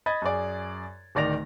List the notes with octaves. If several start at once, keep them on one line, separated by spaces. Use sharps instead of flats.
D#5 B5 G#6 A6
F#2 G#4 D5
D1 D#3 D5 D#5 A#6 F7